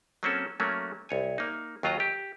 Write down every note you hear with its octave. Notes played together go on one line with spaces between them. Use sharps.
F#3 A#3 C4 C#4 F#4 A4
F#3 A3 A#3 C#4
C2 C#5 G#5
A#3 D#4
D#2 F#3 F4 D#5 A#5
G4